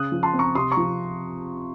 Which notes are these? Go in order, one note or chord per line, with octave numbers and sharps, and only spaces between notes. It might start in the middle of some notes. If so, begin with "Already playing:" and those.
Already playing: C#3 D#6 F#6
F3
A5 C6
C4
A#5 C#6
C3 C6 D#6
A#5 C#6
F3